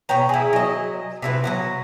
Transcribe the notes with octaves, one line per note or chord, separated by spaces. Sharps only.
B2 C#5 G5 A#5
E4 G#4
F#3 D#5
C3 E4 F#4 B4
F#3 B3 F#5